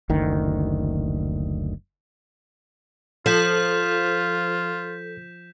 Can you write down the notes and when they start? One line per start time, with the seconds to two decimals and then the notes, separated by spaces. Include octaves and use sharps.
0.09 F#1 D2 D#3
3.26 F3 F4 A4 G6 B6 E7